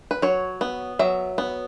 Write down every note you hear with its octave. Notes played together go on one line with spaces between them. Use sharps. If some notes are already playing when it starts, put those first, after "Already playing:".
B4
F#3 C#5
B3
F#3 E5
B3